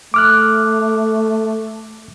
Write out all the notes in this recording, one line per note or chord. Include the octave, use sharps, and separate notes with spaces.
A3 D6 F6 F#6